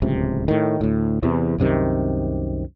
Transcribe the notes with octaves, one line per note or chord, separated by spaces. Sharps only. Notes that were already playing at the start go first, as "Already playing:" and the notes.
D1 C#2 C3
A2 D#3
D2 A2
E2 C3 E3
C2 F#2 C3 D#3